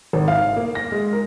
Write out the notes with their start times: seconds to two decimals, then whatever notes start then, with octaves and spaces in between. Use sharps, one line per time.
0.13 G#1
0.28 F5
0.56 A#3
0.75 A#6
0.92 G#3
1.13 A#4